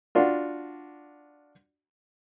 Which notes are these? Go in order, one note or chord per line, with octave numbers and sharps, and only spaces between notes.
D4 F4 F#4